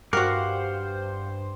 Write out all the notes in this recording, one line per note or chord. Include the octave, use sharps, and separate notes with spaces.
G2 F#4 G4 A#4 C5 F5 F#5 D6